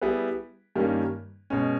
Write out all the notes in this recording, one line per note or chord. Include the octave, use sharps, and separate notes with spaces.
G3 B3 E4 G#4 B4
G2 D#3 G3 A#3 C#4
B2 G#3 C#4